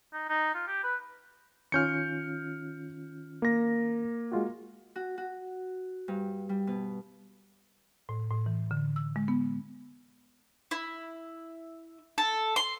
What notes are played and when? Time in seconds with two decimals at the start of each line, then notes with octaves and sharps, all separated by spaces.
0.13 D#4
0.29 D#4
0.54 F4
0.67 G4
0.83 B4
1.72 D#3 C#4 F4 F6 G6 C#7
3.42 A#3 A#6
4.32 G#3 F4 F#4
4.96 F#4
5.18 F#4
6.08 G2
6.49 G3
6.67 B2
8.09 A2
8.30 A2
8.46 E3
8.71 D3
8.96 E6
9.16 G#3
9.28 B3
10.71 E4
12.18 A4
12.56 C6